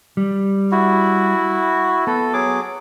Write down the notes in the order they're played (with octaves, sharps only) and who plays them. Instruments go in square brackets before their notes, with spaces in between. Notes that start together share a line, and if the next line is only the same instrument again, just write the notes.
[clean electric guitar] G3
[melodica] E4 F#4
[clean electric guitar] B3 [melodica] A4
[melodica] F#3 G#4 D6